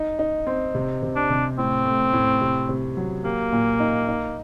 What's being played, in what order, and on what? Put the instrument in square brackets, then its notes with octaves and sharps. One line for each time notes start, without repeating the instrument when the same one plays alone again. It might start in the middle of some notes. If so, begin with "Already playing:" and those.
Already playing: [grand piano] D#4
D#4
C4
C3
C3
[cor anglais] D4
[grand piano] C3
[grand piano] A2 [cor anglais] C4
[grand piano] A3
A2
C3
C3
F#3
[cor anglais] A#3 [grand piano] G4
[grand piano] A#2
D#4
D#4